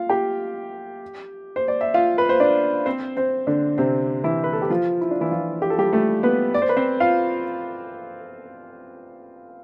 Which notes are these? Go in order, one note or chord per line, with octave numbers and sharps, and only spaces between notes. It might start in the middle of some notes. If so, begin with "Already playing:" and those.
Already playing: F4 F5
G4 G5
C5
D5
E5
F4 F5
B4
C5
D4 D5
C4 C5
C4 C5
D3 D4
C3 C4
E3 E4
B4
A4
G4
F3 F4
E4
D4
E3 E4
F3 F4
G4
A4
G3 G4
A3 A4
B3 B4
D5
C5
B4
C4 C5
F4 F5